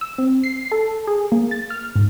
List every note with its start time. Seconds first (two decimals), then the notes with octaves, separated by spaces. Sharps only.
0.01 E6
0.18 C4
0.44 C7
0.72 A4
1.07 G#4
1.32 A#3
1.51 A6
1.70 F6
1.96 G#2